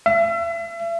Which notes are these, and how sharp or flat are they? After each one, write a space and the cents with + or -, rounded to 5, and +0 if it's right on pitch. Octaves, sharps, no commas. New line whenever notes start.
E5 +40